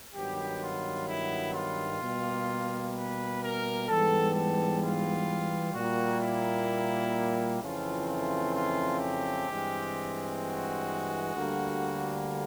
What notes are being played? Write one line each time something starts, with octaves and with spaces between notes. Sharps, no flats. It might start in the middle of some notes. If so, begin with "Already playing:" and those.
G2 D#3 F#3 B3 G4
F4
E4
F4
B2 G3 A#3
B4
A#4
G#2 E3 G3 B3 A4
A4
F4
A#2 G3 A#3 F#4
E4
F2 C#3 E3 A3 C4 F4
F4
F4
G4
G2 E3 G#3 C4
F#4
D2 D3 G3 A#3